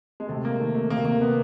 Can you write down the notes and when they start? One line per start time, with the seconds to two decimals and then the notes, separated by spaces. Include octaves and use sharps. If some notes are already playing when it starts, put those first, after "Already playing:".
0.20 G#3
0.28 C3 A3
0.45 A#3
0.59 D#3 A3
0.75 A3
0.90 C3 A#3
1.05 A#3
1.21 C3 B3